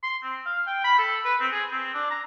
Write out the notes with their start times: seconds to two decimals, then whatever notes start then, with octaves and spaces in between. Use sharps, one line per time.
0.03 C6
0.23 C4
0.46 F5
0.67 G5
0.84 B5
0.99 A4
1.25 B4
1.40 C4
1.52 G#4
1.71 C4
1.94 D4
2.11 A#5